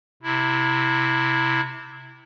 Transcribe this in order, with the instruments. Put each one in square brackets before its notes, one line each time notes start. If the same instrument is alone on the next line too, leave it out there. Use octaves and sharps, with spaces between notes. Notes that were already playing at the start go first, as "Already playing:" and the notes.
[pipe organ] C3 E4